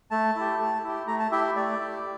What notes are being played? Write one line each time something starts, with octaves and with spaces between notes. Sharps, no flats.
A3 A5
E4 G4
A3
E4 G4
A3 A#5
A5
E4 G4 E5
A3 D5
E4 G4